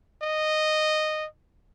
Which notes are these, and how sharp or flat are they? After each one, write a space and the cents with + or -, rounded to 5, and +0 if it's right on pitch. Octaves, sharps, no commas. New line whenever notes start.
D#5 -10